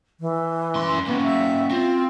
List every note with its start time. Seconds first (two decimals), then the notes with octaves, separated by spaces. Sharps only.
0.20 E3
0.75 F#2 C6
1.07 A#3 B3 C#4
1.22 E5
1.71 C4 F4